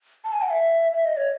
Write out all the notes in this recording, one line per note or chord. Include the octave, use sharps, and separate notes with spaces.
A5
G#5
F#5
E5
E5
D#5
C#5